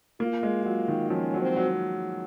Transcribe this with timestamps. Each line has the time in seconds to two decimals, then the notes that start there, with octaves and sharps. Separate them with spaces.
0.20 A#3 F4
0.43 G#3
0.65 F#3 F4
0.88 D#3
1.10 F3 C#4
1.34 F#3
1.42 C4
1.56 F#3